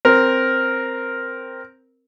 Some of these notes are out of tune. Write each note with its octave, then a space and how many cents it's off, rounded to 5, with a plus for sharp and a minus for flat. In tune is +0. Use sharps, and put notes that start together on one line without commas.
C4 +0 A#4 +0